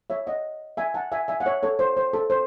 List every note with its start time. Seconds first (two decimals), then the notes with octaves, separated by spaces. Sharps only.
0.10 C#5 E5
0.27 D#5 F#5
0.77 E5 G#5
0.94 F#5 A5
1.12 E5 G#5
1.28 E5 G#5
1.40 F#5
1.45 C#5 E5
1.63 A4 C#5
1.79 C5
1.97 C5
2.13 A4
2.30 C5